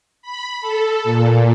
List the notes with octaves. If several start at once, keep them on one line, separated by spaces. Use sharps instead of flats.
B5
A4
A#2